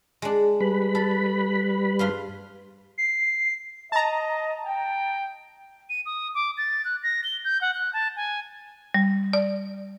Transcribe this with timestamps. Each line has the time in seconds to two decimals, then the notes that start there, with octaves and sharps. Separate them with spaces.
0.22 G#3 D4
0.61 G3 B4 B5
0.95 A4
1.99 G2 F5 C6
2.98 C7
3.92 D#5 A5 A#5
4.66 G5
5.89 D#7
6.06 D#6
6.35 D6
6.58 A6
6.85 F#6
7.03 A#6
7.24 G7
7.45 G6
7.61 F#5
7.74 F#6
7.93 A5
8.17 G#5
8.94 G3
9.33 D5